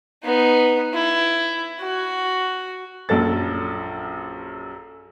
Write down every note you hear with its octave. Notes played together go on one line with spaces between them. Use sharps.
B3 D#4
E4
F#4
A#1 F#2 A4 A6